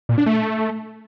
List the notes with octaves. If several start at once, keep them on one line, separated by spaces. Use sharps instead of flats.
A#2
D4
A3